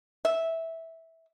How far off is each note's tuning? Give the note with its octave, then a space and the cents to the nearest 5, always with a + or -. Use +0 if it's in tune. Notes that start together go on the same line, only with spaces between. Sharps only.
E5 -10